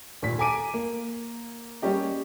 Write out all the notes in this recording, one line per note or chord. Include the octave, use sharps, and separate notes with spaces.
D#2 A#2 B6
A4 G#5 A#5 D6 D7 D#7
A#3
G3 A#3 C#4 G4 D#5